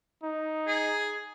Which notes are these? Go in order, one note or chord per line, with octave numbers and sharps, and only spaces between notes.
D#4
G#4